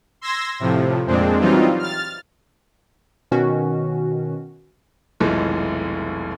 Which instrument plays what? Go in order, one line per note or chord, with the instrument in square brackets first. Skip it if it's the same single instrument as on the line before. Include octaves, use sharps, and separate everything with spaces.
[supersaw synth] C6 E6 G#6 A#6
A2 C3 F3
F2 A#2 G#3 C4 D4
E3 F#3 G3 C4 D#4 F4
F6 A6
[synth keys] B2 D#3 C#4 F#4
[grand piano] F1 B1 E3 F3 G#3